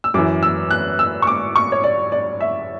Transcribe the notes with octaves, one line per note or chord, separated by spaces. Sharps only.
E6
F#2 E3 D6
E6
F#6
E6
C#6
D6
C#6
C#5
D5
D5
E5